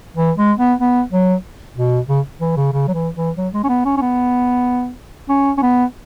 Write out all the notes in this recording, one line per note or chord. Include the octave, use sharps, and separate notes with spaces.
E3
G#3
B3
B3
F#3
B2
C#3
E3
C#3
C#3
F#3
E3
E3
F#3
G#3
C#4
B3
C#4
C#4
B3
C#4
C#4
B3